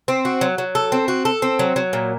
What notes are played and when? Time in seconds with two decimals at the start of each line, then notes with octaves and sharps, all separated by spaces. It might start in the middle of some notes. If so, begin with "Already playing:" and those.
0.08 C4
0.25 F#4
0.41 F#3
0.58 F#3
0.75 A4
0.92 C4
1.08 F#4
1.25 A4
1.42 C4
1.59 F#3
1.76 F#3
1.93 A#2